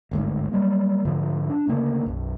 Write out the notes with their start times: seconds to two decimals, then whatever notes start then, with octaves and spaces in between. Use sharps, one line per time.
0.11 G1 D2 G#2
0.52 F#3 G3 A#3
1.05 G#2 D3 F3
1.50 D4
1.67 D2 C#3 A#3
2.04 B1 F#2